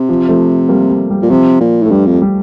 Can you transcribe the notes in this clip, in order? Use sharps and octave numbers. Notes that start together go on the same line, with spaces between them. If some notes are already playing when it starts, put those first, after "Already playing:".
Already playing: C3
F3
F3 A3
G3 A#3
G3
G3
A#2
C3 F3
A#2
A2
A3
G2 G3
F2
G3